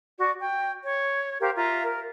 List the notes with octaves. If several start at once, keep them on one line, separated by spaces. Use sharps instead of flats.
F#4 D5
G5
C#5
G4 A#4 C5 F5
F4 E5 A#5
A#4